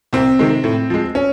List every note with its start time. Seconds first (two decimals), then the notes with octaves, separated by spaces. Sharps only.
0.13 C2 C4
0.39 C3 D#3 G#3
0.64 A2
0.90 F3 G#3
1.15 C#4